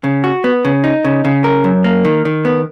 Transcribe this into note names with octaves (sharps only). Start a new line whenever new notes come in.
C#3
F#4
B3
C#3
D#4
C#3
C#3
A#4
F#2
A#3
D#3
D#3
B3